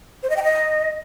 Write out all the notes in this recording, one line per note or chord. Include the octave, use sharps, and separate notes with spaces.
C5
D#5
G5
D#5